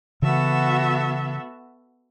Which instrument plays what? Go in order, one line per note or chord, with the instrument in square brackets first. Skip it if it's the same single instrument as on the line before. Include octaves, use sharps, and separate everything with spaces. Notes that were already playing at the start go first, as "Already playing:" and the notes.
[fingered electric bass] C#3 E3 [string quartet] B3 F#4 A4 E5